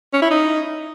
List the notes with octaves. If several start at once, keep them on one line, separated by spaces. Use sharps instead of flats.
C#4
E4
D#4